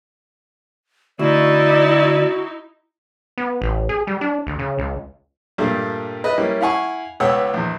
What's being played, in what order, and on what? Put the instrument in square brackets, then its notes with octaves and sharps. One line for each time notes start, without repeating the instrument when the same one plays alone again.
[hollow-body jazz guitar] D2 [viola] D#4 E4 [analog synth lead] F#4 [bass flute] D5
[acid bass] B3
A1
G#4
G3
D4
D2
C#3
C#2
[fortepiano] G2 A#2 G3 A3 A#3 D4
B4 D#5 E5
G3 A#3 C#4 E4
E4 F5 F#5 G#5 C#6
C#2 B3 C#5 F#5 G5 E6
A#1 E2